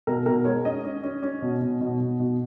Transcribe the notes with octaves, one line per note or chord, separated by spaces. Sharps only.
B2 A#4
B2 A#4
G#3 C#5
C#4 D#5
C#4
C#4
C#4
B2
B2
B2
B2
B2